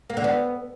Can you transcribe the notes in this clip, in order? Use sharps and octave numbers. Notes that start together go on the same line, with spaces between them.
A#3
D3
B3